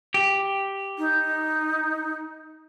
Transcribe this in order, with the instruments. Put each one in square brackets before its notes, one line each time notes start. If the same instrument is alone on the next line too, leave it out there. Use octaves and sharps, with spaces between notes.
[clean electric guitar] G4
[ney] D#4